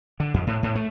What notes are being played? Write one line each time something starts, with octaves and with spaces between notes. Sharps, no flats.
D3
F2
A2
A2
A3